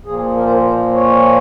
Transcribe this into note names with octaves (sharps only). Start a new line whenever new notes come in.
A#2 F3 A#3 G#4
A#4
C5
A#4
C5
C#5